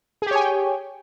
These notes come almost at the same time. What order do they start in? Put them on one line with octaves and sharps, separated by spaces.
G#4 G4 C#5 G#5 G5